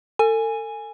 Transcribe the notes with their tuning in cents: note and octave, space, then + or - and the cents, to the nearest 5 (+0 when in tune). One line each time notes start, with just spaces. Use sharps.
A4 +35 G#5 +0